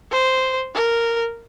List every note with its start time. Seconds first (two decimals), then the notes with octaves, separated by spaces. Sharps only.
0.11 C5
0.75 A#4